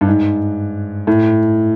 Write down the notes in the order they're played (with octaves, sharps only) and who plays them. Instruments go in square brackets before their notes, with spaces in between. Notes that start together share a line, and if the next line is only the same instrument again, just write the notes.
[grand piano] G2
G#2
A2